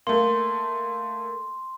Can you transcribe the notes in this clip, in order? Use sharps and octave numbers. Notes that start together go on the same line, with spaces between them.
A3 A#3 C6